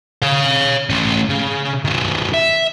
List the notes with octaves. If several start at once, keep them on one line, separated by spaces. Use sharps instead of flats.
C#5 F5
A3 C#4
C#3
D#3 F#3
E5